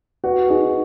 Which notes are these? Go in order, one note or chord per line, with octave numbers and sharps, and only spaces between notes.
F#4 B4
D#4 G#4